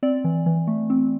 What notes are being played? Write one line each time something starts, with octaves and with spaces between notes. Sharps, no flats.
C4 D5
E3
E3
A3
C4